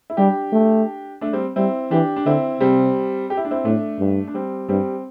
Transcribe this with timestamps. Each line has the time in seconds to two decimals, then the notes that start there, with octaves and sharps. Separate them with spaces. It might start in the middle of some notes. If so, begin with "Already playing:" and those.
0.10 E4
0.17 G3 D4 G4
0.53 A3
1.21 A3 D4
1.33 G3 C4
1.56 G3 C4 E4
1.91 E3 D4 G4
2.16 D4
2.26 D3 C4 E4
2.61 C3 G3 C4
3.30 G4
3.37 E4
3.45 D4
3.51 C4 E4
3.65 A2 A3 D4
3.99 G2
4.28 D4
4.34 G3 C4
4.69 G2 G3 C4